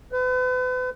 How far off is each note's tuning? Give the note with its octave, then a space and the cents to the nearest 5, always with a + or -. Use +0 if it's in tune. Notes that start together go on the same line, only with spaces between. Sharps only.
B4 +40